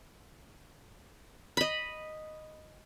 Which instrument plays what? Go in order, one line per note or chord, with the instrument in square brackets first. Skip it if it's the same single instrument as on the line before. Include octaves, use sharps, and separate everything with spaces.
[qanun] D#5 B5